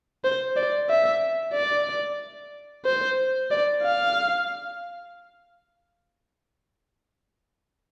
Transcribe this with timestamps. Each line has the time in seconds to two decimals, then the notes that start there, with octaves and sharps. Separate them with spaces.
0.24 C5
0.57 D5
0.90 E5
1.55 D5
2.86 C5
3.51 D5
3.84 F5